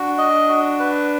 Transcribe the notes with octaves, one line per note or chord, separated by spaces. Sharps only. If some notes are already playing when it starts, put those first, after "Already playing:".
Already playing: D4 F#4
D#5
F#4
B4